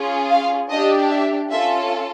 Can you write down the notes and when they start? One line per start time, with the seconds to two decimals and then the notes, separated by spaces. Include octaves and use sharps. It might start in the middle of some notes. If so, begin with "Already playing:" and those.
Already playing: C#4 F4 G#4
0.30 F5
0.70 D4 G4 D#5
1.10 E5
1.50 C#4 F4 A4 E5